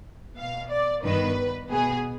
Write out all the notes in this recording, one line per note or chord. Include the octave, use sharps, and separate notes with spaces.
B2 B3 F5
D5
G2 D#3 B3 B4
B2 B3 G#4